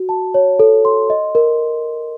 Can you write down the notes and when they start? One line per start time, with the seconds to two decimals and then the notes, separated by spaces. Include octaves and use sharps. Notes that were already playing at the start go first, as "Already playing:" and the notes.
Already playing: F#4
0.09 A5
0.34 C#5
0.59 A4
0.85 C6
1.10 D#5
1.35 A#4